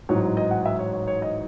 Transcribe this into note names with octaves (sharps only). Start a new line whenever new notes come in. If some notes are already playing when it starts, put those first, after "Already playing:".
A1 G#2 F#3 C#5
D#5
D#5
F#5
E5
C#5
C#5
C#5
D#5